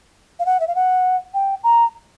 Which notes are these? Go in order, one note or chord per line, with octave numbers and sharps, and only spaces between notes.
F5
F#5
E5
F5
F#5
G5
A#5